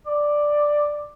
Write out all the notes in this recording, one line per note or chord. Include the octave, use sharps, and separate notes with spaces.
D5